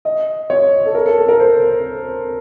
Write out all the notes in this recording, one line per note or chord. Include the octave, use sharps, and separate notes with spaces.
D#5
C#5
A4
A#4
A4
A4
A#4
C5